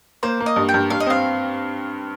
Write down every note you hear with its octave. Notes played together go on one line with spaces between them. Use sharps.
A#3 C5
A#3
D#5
G2
G5
G2
G2 F5
D#5
C4 F5